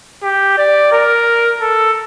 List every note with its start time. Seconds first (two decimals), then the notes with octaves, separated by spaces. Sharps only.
0.23 G4
0.58 D5
0.92 A#4
1.61 A4